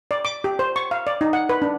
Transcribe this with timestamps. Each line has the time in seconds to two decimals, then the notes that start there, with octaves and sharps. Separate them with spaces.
0.11 D5
0.25 D6
0.44 G4
0.59 C5
0.76 C#6
0.91 F5
1.07 D5
1.21 D#4
1.33 F#5
1.49 B4
1.62 D4